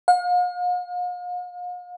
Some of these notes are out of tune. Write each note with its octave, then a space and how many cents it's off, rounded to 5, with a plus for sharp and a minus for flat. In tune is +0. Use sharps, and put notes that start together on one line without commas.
F5 +45